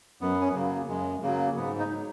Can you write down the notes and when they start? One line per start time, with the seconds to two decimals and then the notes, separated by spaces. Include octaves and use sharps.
0.21 F#2 B3
0.41 C#4
0.48 B3
0.55 C#3 F#3 A#3
0.89 F#2 G#3
1.23 C#3 F#3 A#3
1.57 G#2 B3
1.79 D#4
1.90 F#3